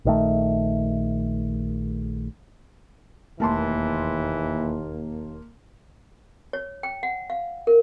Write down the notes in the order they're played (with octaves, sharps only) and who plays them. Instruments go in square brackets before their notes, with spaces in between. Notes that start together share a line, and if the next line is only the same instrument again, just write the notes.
[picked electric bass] A#1 D#3 A3
[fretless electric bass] E1 A3 [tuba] D#2 [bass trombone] E3 [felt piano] A#3 A5 C6
[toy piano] C#5
G5
F#5
F5
A#4